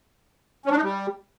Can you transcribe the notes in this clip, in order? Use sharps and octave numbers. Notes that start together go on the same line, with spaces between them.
C#4
D4
D#4
G3